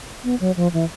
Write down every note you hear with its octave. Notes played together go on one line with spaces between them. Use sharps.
B3
F#3
F3
E3